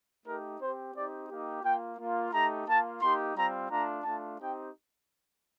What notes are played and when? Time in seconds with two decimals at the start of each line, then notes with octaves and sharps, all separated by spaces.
0.24 A3 D#4 G4 A#4
0.59 C4 G4 C5
0.93 C4 D#4 G4 D5
1.28 A#3 D#4 G4
1.63 A#3 F4 G5
1.97 A#3 F4
2.31 A3 D#4 G4 A#5
2.67 A#3 F4 A5
3.01 A#3 D#4 G4 C6
3.35 G3 C4 F4 A#5
3.70 A3 D4 F4 A#5
4.04 A3 D4 F4 A5
4.39 C4 D#4 G4 G5